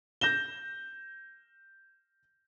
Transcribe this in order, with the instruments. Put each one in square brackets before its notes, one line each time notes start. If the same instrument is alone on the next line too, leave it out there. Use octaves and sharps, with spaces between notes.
[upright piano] G6 A#6 E7 G7